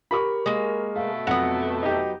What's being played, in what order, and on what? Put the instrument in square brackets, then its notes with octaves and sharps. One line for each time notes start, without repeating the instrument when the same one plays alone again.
[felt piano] G4 A#4 C#6 [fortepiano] B5
[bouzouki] G#3 A#3
[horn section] B2 A3 [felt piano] F5
[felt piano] F2 [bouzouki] F#3 B3 [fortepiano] F#5
[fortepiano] D#4 G4